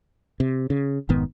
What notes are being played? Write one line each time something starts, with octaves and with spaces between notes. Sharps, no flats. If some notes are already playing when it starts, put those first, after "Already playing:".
C3
C#3
F1 G#2 D#3 B3